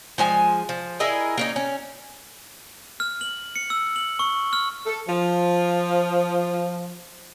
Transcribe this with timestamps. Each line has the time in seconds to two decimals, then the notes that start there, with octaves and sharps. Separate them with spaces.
0.18 F3 G#3 G#5
0.69 F3
1.00 E4 G#4 A#4 D#5
1.38 A#3 C#4 D#4
1.56 C#4
3.00 F6
3.21 F#7
3.56 C#7
3.70 E6
3.96 F#7
4.19 C#6
4.53 F6
4.86 A4
5.08 F3